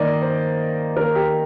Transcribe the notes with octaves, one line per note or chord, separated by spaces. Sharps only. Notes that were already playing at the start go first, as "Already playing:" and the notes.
Already playing: D#3 A#3 D5 D#5
C5
D#3 A#3 A#4
G4